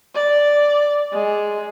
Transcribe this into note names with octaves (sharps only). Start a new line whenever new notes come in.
D5
G#3